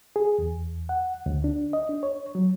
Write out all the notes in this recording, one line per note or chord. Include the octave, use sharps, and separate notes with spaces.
G#4
E2
F#5
D2
D4
D#5
D4
C#5
F#3